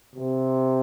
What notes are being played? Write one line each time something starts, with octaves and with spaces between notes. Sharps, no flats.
C3